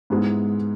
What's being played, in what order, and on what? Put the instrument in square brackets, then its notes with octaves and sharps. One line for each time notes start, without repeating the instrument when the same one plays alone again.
[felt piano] G#2 G#3 B3 E4